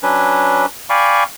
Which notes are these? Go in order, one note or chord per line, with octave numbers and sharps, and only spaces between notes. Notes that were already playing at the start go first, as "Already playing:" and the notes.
F#3 C#4 D4 B4
D5 F5 G5 G#5 B5 C#6